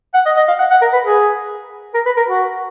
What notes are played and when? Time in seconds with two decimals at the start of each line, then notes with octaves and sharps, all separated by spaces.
0.14 F#5
0.26 D#5
0.36 D#5
0.48 F5
0.59 F#5
0.71 F#5
0.81 A#4
0.93 B4
1.04 G#4
1.94 A#4
2.06 B4
2.17 A#4
2.28 F#4